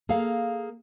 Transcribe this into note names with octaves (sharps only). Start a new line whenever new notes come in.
A#3 G#4 A4 F5